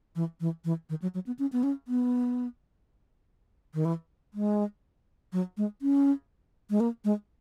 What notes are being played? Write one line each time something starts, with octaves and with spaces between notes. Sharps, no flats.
E3
E3
E3
D#3
F#3
F#3
B3
C#4
B3
C#4
B3
D#3
E3
G#3
F#3
G#3
C#4
G#3
A#3
G#3